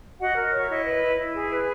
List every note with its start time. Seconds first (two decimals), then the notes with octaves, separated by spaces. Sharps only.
0.20 F#4 D#5 F#5
0.36 A#4
0.52 C#5
0.61 E5
0.69 E4 D#5
0.85 B4
1.02 E4
1.18 E4
1.34 G#4
1.50 B4